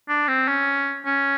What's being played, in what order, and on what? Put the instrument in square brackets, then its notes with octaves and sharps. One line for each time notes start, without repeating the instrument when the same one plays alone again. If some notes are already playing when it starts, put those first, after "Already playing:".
[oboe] D4
C4
C#4
C#4